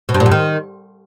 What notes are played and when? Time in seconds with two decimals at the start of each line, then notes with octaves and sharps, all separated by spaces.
0.09 B2
0.14 G2
0.20 A#2
0.26 F#2
0.31 D#3